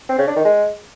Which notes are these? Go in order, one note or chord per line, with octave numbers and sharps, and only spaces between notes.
C4
C#3
D4
D#3
G#3